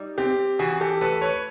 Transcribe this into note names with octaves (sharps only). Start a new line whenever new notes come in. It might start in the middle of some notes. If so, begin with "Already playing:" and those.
Already playing: G3 D#4
C4 G4
E3 F#4 G#4
G4 A4
A3 A4 B4
B4 C#5